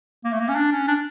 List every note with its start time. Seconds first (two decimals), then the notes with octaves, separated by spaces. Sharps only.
0.24 A#3
0.32 A3
0.40 A#3
0.48 C#4
0.56 D4
0.72 C#4
0.87 D4